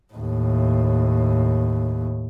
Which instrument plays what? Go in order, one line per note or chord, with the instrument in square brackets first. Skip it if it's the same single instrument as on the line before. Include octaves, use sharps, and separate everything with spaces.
[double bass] D#2 A2